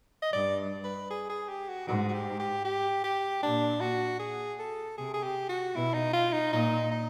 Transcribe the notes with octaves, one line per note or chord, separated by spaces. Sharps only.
D#5
G2 D5
B4
G#4
G#4
G4
F#4
G#2 F#4
F#4
G4
G4
G4
G4
A#2 D4
F#4
G#4
A4
C3 G#4
G#4
G4
F#4
B2 E4
D#4
F4
D#4
A#2 D#4
D#4